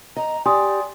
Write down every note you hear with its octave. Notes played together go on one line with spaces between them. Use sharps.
D#5 A#5
G4 D5 G#5 C6 D#6